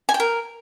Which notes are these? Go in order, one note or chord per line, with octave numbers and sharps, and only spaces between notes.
G#5
G5
A#4